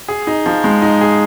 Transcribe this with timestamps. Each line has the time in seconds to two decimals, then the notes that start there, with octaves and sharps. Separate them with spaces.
0.08 G#4
0.27 D#4
0.46 F3
0.64 G#3
0.82 D#4
1.01 G#4